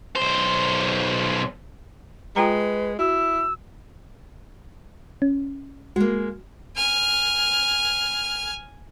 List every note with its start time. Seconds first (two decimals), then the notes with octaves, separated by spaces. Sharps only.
0.16 B1 C5
2.36 G#3 F4 B4 G5 A#5
2.99 E4 F#4 E6
5.22 C#4
5.96 G#3 A#3 F#4
6.77 G#5 F6